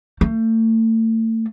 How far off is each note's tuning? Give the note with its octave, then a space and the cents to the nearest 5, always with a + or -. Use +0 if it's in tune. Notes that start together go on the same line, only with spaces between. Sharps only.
A3 +35